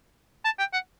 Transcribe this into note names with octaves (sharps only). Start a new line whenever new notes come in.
A5
G5
F#5